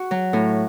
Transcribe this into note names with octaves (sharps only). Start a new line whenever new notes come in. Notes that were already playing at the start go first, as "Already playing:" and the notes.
Already playing: F#4
F#3
A2